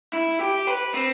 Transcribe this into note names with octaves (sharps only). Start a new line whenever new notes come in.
E4
G4
B4
C4